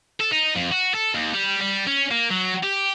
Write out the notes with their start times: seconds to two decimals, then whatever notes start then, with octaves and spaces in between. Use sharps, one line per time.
0.20 A4
0.32 D#4
0.56 F2
0.72 F#4
0.94 A4
1.15 D#2
1.34 G3
1.61 G3
1.87 C#4
2.11 A#3
2.30 F#3
2.63 G4